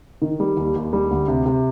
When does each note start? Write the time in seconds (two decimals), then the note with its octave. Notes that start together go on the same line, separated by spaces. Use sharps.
0.22 D#3
0.40 G3
0.57 D#2
0.76 D#2
0.93 G3
1.11 D2
1.28 C3
1.46 C3